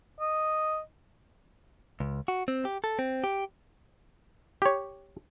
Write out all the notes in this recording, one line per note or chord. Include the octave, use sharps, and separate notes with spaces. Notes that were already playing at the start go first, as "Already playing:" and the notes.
D#5
C#2
F#4
C4
G4
A4
C4
G4
G4 C#5